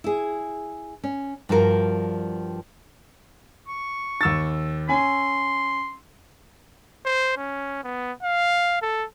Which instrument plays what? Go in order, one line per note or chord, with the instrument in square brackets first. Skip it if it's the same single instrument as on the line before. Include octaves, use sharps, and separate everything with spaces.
[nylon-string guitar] E4 G#4
C#4
G2 F3 F#4 A#4
[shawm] C#6
[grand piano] D#2 E6 A6
[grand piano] C#4 G#5 [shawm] C6
[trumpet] C5
C#4
B3
F5
A4